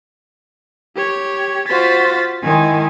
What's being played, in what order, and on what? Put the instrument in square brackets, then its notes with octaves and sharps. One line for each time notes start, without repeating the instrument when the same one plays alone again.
[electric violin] G4 C#5
[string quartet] F4 F#4 C5 [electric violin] A6 B6
[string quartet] D#3 G#3 [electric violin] E4 G#5